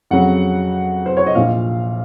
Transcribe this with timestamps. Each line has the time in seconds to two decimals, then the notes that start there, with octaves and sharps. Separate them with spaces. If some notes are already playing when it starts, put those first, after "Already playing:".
0.11 F2 C#3 F#3 F#5
1.06 C5
1.17 C#5
1.27 D#5
1.35 A#1 A#2 F3 F5